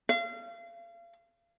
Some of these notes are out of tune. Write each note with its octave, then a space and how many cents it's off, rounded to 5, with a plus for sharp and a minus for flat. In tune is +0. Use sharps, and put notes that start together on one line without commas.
F5 -35